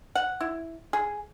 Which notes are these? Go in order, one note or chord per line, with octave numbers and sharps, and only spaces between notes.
F#5
E4
G#4